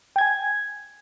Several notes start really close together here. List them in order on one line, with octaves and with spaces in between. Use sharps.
G5 G#6 G#5